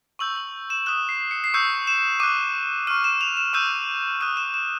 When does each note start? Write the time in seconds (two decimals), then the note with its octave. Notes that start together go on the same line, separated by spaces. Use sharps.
0.19 C#6 E6 G6 F#7
0.36 F#7
0.70 E7
0.86 D#6 F#6 E7
1.09 C7
1.31 C#7
1.44 C7
1.54 C#6 E6 G6 C#7
1.87 E7
2.20 D6 F#6 D#7
2.87 C#6 F6 D#7
3.04 E7
3.21 F7
3.37 E7
3.53 C#6 E6 G6 D#7
4.21 D#6 F#6 D#7
4.37 E7
4.54 E7